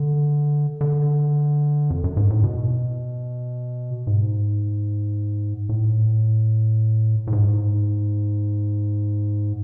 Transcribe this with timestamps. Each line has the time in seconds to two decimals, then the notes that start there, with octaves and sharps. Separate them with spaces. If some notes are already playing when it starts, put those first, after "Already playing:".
Already playing: D3
0.81 D3
1.90 F2
2.04 F#2
2.17 G#2
2.30 A2
2.44 B2
4.07 G#2
5.69 A2
7.27 A2
7.33 G#2